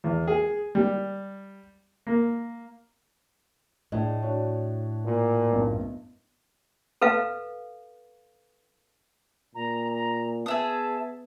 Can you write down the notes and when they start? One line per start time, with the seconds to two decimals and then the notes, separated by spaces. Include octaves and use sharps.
0.04 E2
0.27 G#4
0.75 G3
2.07 A#3
3.92 A2 D4 G#4 D#5
4.22 D4 F#4 C#5
5.05 A#2
5.51 F#1 B1 G2
7.02 A4 B4 F5
9.55 A#2 A#5
9.93 A#5
10.46 B3 G#4 E5 A5 D#6